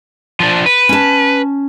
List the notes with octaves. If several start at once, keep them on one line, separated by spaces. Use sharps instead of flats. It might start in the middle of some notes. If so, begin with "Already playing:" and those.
F3 D4
B4
C#4 A5